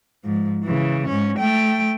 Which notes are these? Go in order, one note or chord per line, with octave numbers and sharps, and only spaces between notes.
G#2 F3
C#3 E3
G#2 C#4
A3 G5